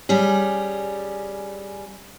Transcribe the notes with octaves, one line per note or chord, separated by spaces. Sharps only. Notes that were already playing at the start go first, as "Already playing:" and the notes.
G3 C#4 G#4